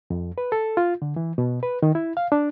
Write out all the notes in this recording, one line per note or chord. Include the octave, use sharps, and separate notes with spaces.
F2
B4
A4
F4
D3
E3
B2
B4
D#3
E4
F5
D4